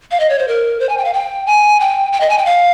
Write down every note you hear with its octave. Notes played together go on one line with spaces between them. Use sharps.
F5
D#5
C#5
C5
A#4
C5
G#5
G5
F5
G5
G#5
G5
G5
D#5
G#5
G5
F5